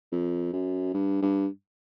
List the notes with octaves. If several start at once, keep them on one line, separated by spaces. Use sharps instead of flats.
F2
F#2
G2
G2